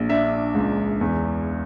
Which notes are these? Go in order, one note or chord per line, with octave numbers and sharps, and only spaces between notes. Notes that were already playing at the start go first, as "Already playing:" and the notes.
Already playing: A#1
D4 E5
C#2
E2